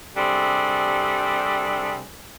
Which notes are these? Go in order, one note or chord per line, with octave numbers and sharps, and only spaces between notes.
C3 G3 C4 D4 G#4 A4